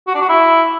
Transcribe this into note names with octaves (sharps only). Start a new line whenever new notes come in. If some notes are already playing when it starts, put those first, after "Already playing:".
F#4
D4
F#4
E4